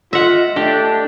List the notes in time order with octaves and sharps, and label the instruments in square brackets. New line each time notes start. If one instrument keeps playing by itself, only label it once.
[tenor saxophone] F4 [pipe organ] D#5 [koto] E5 F#5
[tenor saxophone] A3 [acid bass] D4 [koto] G4